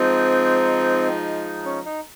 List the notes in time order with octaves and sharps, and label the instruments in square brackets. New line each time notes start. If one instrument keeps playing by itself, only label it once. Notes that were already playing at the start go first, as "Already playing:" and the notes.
Already playing: [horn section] F3 G#3 D#4 [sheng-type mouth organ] C4
[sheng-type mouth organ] C#4
D#4